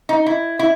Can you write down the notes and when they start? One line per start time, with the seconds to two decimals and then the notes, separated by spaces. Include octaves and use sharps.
0.09 D#4
0.26 E4
0.59 E4